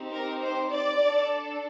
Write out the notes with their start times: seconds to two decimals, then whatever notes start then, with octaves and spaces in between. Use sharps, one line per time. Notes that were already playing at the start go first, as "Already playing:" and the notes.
Already playing: C4 D#4 G4
0.12 A#4
0.42 C5
0.70 D5
1.00 D4 A4